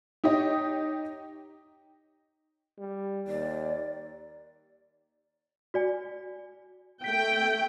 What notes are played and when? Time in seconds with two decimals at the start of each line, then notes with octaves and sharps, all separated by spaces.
0.24 D#4 G4 C#5 D#5
2.79 G3
3.28 D#2 D5
5.74 F#4 D5 G#5
7.04 A3 G5 B6